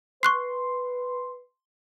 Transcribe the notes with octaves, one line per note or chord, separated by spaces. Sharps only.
B4 C6 C#6 F#6 C7